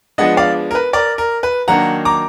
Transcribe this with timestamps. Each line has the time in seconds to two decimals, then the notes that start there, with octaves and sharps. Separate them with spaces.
0.18 F3 G#3 B3 D4 D#5 F#5
0.37 D5 F5
0.71 A#4
0.75 B4
0.93 A#4 D5
1.18 A#4
1.43 B4
1.68 D#3 F#3 A#3 D4 F#5 A#5
2.05 A#5 D6